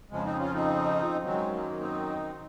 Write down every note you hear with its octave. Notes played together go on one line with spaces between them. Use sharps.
F2 C#3 F3 G#3
C4 D#4
C#4 F4
C4 D#4
F#2 D#3 F#3 G#3 C4
A#3
C4 D#4